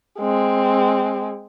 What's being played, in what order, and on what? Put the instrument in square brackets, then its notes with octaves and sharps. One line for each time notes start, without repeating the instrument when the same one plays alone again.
[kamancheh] G#3 C4